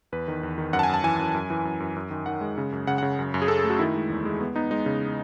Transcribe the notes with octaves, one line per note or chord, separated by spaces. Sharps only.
E2 B4
D#3
E2
D#3
F#2 F#5
A5
G#5
F#2 A5
E3 G#5
F#2
F#2
E3
F#2
F#2
F#2
D#3
D#3 F#5
G#3
C#3
F#2
C#3 F#5
C#3 F#5
F#2
F#2
G#4
F#2 A4
G#4
A3
F#4
D#3 E4
G#3
E2
G#3
B3
B3 D#4
G#3 D#4
C#3